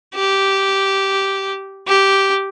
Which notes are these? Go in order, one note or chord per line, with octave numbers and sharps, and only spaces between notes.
G4
G4